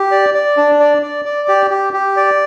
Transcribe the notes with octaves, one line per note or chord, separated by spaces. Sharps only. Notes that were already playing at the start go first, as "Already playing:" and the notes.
Already playing: G4
D5
D5
D4
D5
D5
D5
G4
G4
G4
D5